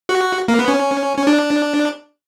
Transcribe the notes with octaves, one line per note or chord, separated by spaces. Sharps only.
F#4
A#3
B3
C#4
C#4
D4